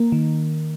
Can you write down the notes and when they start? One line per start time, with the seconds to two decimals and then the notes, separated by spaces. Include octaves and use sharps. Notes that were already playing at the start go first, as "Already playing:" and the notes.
Already playing: A#3
0.12 D#3